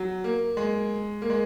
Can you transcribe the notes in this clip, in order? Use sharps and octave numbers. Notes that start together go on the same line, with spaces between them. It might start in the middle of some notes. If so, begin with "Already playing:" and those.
Already playing: F#3
A#3
G#3
A#3
G#3